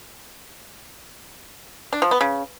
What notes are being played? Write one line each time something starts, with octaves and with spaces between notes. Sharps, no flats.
D4
F3
B3
C#3